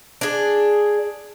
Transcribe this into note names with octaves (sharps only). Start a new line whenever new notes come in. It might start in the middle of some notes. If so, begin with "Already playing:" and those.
D4 G#4